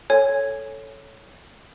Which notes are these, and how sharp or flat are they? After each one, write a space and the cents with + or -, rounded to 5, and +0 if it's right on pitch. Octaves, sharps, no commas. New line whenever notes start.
A4 +0 C#5 +0 G#5 +0